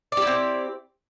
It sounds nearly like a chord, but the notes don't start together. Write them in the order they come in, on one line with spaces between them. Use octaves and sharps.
D5 G4 E4 C4